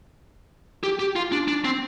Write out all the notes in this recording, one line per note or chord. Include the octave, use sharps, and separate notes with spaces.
G4
G4
F4
D4
D4
C4